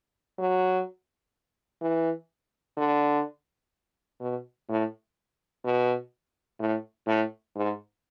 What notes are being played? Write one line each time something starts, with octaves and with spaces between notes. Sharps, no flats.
F#3
E3
D3
B2
A2
B2
A2
A2
G#2